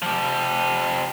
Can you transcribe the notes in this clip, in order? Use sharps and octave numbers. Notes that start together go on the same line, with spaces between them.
F3 G4